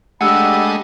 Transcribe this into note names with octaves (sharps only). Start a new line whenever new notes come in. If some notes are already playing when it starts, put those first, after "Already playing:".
G#3 A3 D4 G4 D#5 F#5 B5 E6